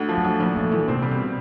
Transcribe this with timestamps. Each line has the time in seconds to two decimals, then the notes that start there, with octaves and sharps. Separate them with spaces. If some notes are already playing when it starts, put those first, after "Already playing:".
Already playing: D2
0.08 F3
0.17 F#3
0.24 D2
0.40 A#2 F3
0.55 F3 A3
0.71 A#2 E3
0.87 C3 C4
1.02 G3
1.11 B2